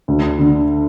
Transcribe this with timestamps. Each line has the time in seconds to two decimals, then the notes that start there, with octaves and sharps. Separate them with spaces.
0.08 D2
0.39 D3